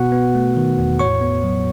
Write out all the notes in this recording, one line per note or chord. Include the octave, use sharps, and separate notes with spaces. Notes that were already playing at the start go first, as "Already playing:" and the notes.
Already playing: B2 B3 F#4 F#5
B3
A3
D#3
E2
A2 C#5 C#6
B3
F#3